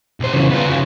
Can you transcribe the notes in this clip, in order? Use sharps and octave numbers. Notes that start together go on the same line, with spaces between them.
B1 C5
C#3 E3
B3 F4
C#3 F3